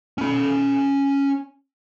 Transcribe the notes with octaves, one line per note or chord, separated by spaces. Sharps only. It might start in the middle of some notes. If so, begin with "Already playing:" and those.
C#4 B5